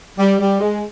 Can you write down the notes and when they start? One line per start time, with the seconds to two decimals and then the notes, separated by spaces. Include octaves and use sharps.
0.19 G3
0.40 G3
0.60 G#3